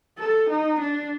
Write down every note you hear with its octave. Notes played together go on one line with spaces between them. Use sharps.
A4
D#4
D4